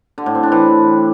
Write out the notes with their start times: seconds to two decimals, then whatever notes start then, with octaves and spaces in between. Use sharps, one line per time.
0.18 D3
0.26 A2
0.35 C4
0.43 D4
0.52 E3